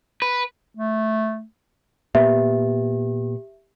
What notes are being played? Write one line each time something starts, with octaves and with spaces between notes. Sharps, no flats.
B4
A3
A#2 B3 G4 E5